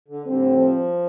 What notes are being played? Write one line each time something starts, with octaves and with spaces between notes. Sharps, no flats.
D3
A2 D3 G3 C4
F3